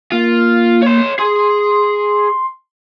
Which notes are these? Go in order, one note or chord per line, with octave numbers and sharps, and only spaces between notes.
A#3 F4
C#5 C6
G#4 C6